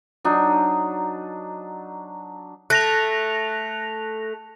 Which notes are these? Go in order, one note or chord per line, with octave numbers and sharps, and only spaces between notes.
F#3 D4 D#4
A3 F#6 A#6 F7